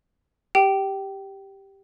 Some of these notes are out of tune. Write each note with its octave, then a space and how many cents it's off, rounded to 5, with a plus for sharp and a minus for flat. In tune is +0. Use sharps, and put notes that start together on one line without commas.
G4 +0 G5 -20